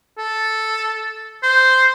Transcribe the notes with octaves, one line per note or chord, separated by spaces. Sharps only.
A4
C5